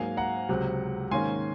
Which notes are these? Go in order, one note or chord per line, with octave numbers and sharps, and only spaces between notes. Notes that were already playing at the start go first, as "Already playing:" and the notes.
Already playing: G#2 F#3 A#3 F5 G#5
F#5 A#5
C#2 C3 F#3
G#2 D#3 A#3 C#4 G#5 C6